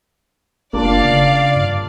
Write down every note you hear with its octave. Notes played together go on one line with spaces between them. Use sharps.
F#1 A#3 D4 F4 D5 F5
C#3
G2